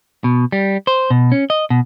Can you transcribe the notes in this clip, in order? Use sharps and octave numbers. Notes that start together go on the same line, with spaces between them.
B2
G3
C5
B2
C#4
D#5
B2